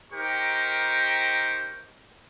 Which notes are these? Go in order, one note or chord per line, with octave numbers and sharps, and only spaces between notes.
D#4 G4 A#4 C5 G5 C#6